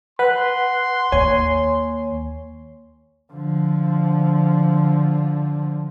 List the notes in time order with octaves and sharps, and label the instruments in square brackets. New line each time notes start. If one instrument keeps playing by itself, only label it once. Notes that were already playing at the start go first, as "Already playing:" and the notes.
[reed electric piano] B4 [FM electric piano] F#5 F#6 [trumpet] C6
[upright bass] D#2 [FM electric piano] C#5 [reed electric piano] G#5
[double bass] D3 F3